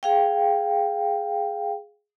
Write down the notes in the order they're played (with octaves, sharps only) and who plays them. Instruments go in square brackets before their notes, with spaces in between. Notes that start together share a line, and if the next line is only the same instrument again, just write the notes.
[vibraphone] G#4 F5 G5